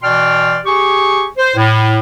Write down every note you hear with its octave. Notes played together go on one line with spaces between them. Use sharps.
B2 E3 D5 G5 C6 F6
G4 G#4 G#5 C#6
C5
A2